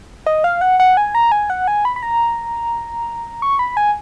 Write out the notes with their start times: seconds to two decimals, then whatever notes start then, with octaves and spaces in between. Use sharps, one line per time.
0.27 D#5
0.44 F5
0.61 F#5
0.80 F#5
0.97 G#5
1.15 A#5
1.32 G#5
1.50 F#5
1.68 G#5
1.85 B5
1.96 B5
2.03 A#5
3.42 C#6
3.59 B5
3.77 G#5